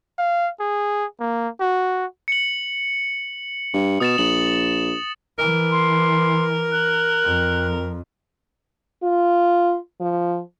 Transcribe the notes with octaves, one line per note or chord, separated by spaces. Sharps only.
F5
G#4
A#3
F#4
C#7 F#7
G2
B2 D#6 A6 E7
A#1 F#7
E3 A#4
C6
F#6
F2
F4
F3